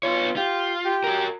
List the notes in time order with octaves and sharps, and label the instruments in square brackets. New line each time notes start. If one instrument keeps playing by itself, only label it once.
[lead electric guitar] B3 C#5 [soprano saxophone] F4
[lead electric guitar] F4 [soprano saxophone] G4
[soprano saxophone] G4
[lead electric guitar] F#4 A#4